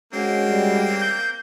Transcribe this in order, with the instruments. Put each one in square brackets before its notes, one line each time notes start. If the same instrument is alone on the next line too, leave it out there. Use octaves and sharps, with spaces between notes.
[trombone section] G#3 C#4 F#4 [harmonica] A#3 C4
[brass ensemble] G3
[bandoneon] G6